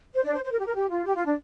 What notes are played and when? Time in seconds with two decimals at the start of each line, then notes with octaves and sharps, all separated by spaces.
0.13 C5
0.23 D4 D5
0.34 C5
0.44 C5
0.52 A#4
0.59 G4
0.67 A#4
0.75 G4
0.90 F4
1.06 G4
1.15 F4
1.26 D4